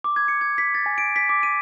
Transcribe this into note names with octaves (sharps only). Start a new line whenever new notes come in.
D6
G#6
C#7
G#6
B6
A6
G#5
D7
B6
D6
D#7